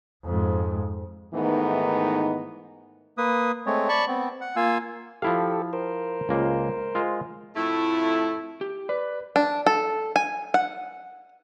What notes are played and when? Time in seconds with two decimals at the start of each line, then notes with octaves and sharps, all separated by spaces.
0.25 F2 G#2
1.34 G#2 D#3 E3 A3 B3 D#4
3.18 A#3 B4 D#6
3.66 G#3 A3 C4 C#5
3.89 D5 A5 B5 C#6
4.07 B3 C4
4.41 F#5
4.56 A#3 F4 F5 G#5 E6
5.22 F3 E4 G4 A4 F5
5.73 A#4 C5
6.29 C#2 A#3
6.95 G#3 F4
7.55 F2 A2 A3 E4
8.61 G4
8.89 B4 D5
9.36 D4
9.66 A4
10.16 G#5
10.54 F#5